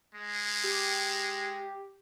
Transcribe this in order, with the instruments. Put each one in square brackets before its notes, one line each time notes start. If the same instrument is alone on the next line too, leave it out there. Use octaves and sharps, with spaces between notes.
[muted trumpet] G#3
[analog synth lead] G4